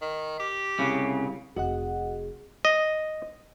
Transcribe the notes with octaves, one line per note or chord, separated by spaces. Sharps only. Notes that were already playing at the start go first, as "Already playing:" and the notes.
D#3
G4
C2 C#3
F1 F#4 G#4 D#5 F#5
D#5